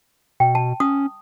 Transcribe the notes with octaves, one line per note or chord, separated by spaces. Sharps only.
B2 G5
A5
C#4 D#6